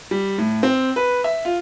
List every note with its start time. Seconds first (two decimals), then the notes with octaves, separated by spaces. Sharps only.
0.11 G3
0.38 A2
0.63 C4
0.96 B4
1.24 E5
1.45 F4